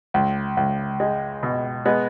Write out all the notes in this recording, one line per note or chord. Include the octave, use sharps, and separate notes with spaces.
C#2
C#2
G#3
B2
G#3 B3